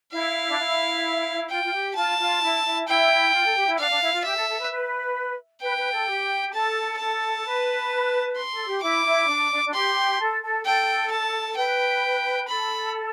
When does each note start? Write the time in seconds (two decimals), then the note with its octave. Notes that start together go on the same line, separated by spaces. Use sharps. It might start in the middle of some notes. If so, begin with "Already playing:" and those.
0.12 E4 F5
0.48 D4
0.59 E4
1.50 F4 G5
1.63 F4
1.72 G4
1.96 F4 A5
2.18 F4
2.42 E4
2.65 E4
2.87 E4 G5
3.33 F4
3.45 A4
3.56 G4
3.67 E4
3.78 D4 F5
3.90 D4
4.01 E4
4.13 F4
4.24 G4 E5
4.36 A4
4.48 A4
4.59 B4
4.71 B4
5.62 B4 G5
5.76 B4
5.92 A4
6.08 G4
6.53 A4 A5
6.98 A4 A5
7.45 B4
8.36 C6
8.52 A4
8.66 G4
8.82 E4 D6
9.05 E4
9.27 D4
9.51 D4
9.65 D4
9.73 G4 C6
10.19 A4
10.42 A4
10.65 A4 G5
11.11 A5
11.56 B4 G5
12.48 A4 B5